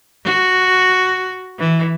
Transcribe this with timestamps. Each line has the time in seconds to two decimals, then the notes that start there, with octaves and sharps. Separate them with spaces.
0.25 F#4
1.59 E3